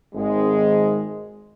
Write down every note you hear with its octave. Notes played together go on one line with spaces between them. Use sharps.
G#1 G#3